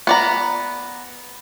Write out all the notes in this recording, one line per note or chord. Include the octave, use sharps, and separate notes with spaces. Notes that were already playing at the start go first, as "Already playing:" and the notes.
B3 D5 A#5